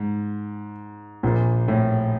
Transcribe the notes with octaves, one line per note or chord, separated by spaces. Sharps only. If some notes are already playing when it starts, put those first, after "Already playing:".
Already playing: G#2
A#1 A#2
A2